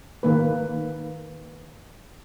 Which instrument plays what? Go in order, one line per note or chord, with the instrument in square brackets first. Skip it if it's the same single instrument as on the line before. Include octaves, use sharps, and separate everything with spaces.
[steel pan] D#3 A#3 B4